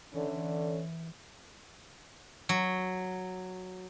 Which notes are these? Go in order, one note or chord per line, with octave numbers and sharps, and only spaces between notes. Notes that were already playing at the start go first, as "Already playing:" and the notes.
D3 E3 C#4
F#3